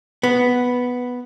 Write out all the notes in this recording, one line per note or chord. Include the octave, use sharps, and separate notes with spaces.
B3